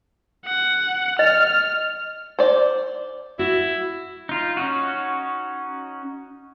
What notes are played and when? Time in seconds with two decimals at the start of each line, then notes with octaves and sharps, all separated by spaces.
0.45 F#5
1.19 D#5 F6
2.39 C5 D5
3.39 E4 F#4
4.29 D#4 F4
4.57 C#4 D#4 F#4